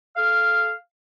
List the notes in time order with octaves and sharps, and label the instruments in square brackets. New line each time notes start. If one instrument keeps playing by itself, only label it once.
[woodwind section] A4 F5 F6